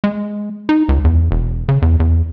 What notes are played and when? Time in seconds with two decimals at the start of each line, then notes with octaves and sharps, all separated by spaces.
0.04 G#3
0.69 D#4
0.89 C#2
1.04 E2
1.31 E1
1.69 C#3
1.82 E2
2.00 E2